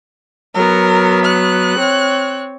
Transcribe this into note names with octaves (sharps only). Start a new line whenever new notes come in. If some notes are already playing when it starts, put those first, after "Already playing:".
F#3 B3 A#4
F#6
C4 C#5